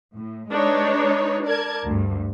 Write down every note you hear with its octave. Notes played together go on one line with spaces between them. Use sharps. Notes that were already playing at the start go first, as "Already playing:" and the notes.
A2
G#3 D4 D#4 B4 C#5
A#4 D5 A5 G#6
D2 G2